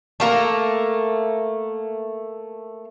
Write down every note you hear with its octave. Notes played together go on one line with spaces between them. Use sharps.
A3 A#3 A#4